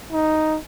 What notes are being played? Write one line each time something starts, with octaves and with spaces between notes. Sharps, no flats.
D#4